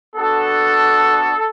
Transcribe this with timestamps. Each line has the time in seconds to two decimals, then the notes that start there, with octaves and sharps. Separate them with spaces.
0.16 B3 D4 F#4 A4